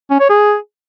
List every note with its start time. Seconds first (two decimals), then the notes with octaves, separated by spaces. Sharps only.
0.10 C#4
0.20 C#5
0.30 G#4